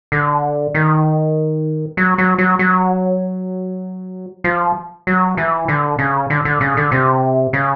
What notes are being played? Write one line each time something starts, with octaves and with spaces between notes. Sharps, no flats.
D3
D#3
F#3
F#3
F#3
F#3
F3
F#3
E3
D3
C#3
D3
D3
C#3
D3
C3
C#3